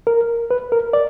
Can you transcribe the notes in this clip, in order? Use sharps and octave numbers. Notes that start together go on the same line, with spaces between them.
A#4
B4
A#4
D5